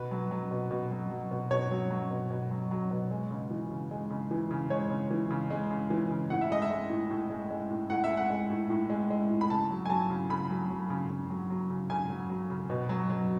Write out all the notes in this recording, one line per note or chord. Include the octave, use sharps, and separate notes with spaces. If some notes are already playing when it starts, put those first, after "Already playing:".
Already playing: B2 B4
F#3
F#3
B2
B2
F#3
F#3
B2
B2 C#5
F#3
F#3
B2
B2
F#3
F#3
B2
G#3
C#3
E3
C#3
G#3
C#3
E3
C#3
G#3 C#5
C#3
E3
C#3
G#3
C#3
E3
C#3
A2 F#5
E5
G#3 D#5
E5
G#3
A2
A2
G#3
G#3
A2
A2 F#5
E5
G#3
F#5
G#3
A2
A2
G#3
G#3
A2
B5
C#3 A5
F#3
G#5
F#3 A5
C#3
C#3 B5
F#3
F#3
C#3
C#3
F#3
F#3
C#3
C#3 G#5
F#3
F#3
C#3
B2
F#3
F#3